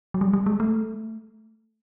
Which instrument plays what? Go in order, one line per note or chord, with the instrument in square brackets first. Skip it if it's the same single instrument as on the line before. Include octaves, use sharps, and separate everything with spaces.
[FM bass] F#3
G3
G3
G#3
A3